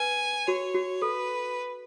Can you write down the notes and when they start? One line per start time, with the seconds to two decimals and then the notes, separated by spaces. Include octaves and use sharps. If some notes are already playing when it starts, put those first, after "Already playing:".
Already playing: B4 G#5
0.47 F#4 C#5
0.74 F#4
1.02 A4 B4